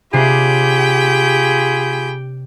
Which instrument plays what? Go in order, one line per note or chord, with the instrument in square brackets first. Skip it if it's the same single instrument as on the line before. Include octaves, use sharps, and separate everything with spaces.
[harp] C3 D4 C7 [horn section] F4 G#4 B5 [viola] G4 G5